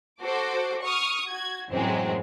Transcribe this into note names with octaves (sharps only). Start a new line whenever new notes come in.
F#4 A4 C5 D6
C#6 D#6 F6
F#4 G#6
F#2 A2 E3 F#3 G#3 C4